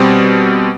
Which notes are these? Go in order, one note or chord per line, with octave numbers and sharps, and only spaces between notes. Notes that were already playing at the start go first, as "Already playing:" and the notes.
Already playing: B2 G3 C4